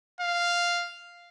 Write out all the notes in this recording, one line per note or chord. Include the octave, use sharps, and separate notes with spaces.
F5